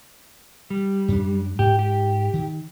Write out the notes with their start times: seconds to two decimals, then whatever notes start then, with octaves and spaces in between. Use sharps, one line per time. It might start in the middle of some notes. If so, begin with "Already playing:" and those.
0.70 G3
1.08 F#2 D4
1.59 G#2 G4
1.79 G4
2.34 D#3